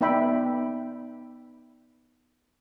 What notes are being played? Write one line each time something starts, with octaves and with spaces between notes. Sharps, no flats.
B3 D#4 D5 E5 G5 B5